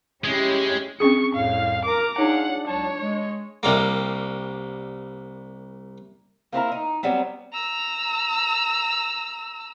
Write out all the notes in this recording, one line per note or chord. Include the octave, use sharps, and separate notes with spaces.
G#3 C#4 E4 G4
C4 C#4 G#4 C#6
C2 F2 A2 F5
A#4 A#5 D6
D4 D#4 F4 G#4 C#5 F#5
C#2 F#3 C#5 A5
G#3
C2 G3 A#3
A#3 C4 E4 A#4
D#4
F#3 G3 B3 C4
A#5 E6